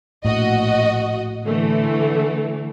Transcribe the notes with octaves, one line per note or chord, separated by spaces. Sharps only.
A#1 A2 F#4 D#5
D3 E3 A3